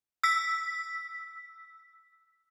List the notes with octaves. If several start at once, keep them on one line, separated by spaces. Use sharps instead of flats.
E6 B6